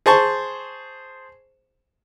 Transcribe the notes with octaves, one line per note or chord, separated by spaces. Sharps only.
G#4 C5 A5 C#6